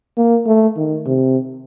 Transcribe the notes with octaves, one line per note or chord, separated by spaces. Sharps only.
A#3
A3
D#3
C3